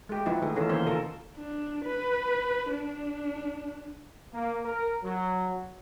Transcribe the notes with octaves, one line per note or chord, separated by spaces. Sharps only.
G#3 G4
F3 B3 D#4 E4 F#4
D#3 A3 G#4
E3 A3 B3 C#4 F4 A4
D#3 E3 A#3 C#4 C5 C#5
C#3 F4 A4 A#4
D4
B4
D4
A#3
A#4
F#3